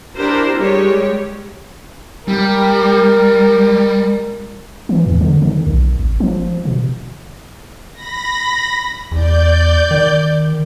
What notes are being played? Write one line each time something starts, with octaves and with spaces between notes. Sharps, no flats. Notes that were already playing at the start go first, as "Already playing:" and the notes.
D4 E4 G4 A#4 C5
G3 G#3 G4 C#5
G3 A#4
E3
E2
D3
D#3
B1
G#1
F3
B2
B5 A#6
E2 D5 G6
D#3